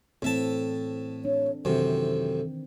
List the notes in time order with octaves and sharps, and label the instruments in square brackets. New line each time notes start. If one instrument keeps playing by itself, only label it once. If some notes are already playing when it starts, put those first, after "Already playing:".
[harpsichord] A2 E5 A5 [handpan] E3 C4 A4
[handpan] D4 [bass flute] C#5
[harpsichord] F#2 C3 [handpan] D#3 E3 C4 [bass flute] A4